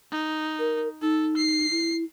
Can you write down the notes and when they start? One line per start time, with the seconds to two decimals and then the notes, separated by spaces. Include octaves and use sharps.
0.11 D#4
0.59 A#4
1.02 D#4 A4
1.37 C7
1.71 E4